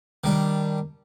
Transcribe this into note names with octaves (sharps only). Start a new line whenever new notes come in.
D#3 G3 D4